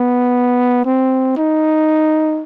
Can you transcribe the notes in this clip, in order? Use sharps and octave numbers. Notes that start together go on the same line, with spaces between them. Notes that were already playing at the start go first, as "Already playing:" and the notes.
Already playing: B3
C4
D#4